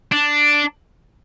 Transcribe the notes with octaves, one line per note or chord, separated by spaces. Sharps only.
D4